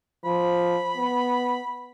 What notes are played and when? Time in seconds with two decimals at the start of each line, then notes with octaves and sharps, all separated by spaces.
0.25 F3 B5
0.96 B3